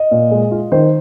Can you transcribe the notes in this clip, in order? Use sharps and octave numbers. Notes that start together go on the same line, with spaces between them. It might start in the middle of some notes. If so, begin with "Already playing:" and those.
Already playing: D#5
A#2
G#3
F4
D#3 C5